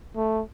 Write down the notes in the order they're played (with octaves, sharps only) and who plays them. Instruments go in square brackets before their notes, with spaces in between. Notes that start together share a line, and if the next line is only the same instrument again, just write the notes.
[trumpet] A3